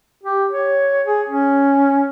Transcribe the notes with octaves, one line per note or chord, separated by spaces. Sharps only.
G4
C#5
G#4
C#4